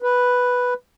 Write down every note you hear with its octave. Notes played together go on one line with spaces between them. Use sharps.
B4